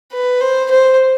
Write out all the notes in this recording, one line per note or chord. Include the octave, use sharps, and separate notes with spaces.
B4
C5
C5